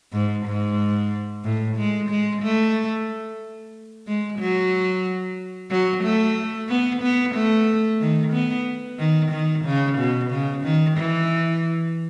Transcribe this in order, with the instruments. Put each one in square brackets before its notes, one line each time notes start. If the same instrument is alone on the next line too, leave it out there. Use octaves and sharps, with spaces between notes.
[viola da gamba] G#2
G#2
A2
G#3
G#3
A3
G#3
F#3
F#3
A3
B3
B3
A3
D#3
B3
D#3
D#3
C#3
B2
C#3
D#3
E3